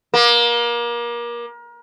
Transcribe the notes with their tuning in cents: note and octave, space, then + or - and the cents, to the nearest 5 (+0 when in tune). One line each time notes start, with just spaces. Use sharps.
A#3 +30